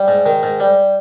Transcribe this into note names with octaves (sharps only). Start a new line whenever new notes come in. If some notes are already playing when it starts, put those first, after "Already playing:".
Already playing: G3
G#2
D#3
G#2
G3